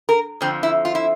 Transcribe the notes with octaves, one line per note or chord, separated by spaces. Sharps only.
A#4
F2 D3 F3 C4
E4
F4
E4